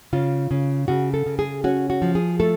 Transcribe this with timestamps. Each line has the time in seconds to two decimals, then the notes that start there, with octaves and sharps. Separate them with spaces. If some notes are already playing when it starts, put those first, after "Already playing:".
0.13 C#3 F4
0.51 C#3
0.88 C#3 F#4
1.14 A4
1.26 C#3
1.39 G#4
1.64 C#4 F#4
1.90 F#4
2.02 F3
2.15 G#4
2.40 A3 A4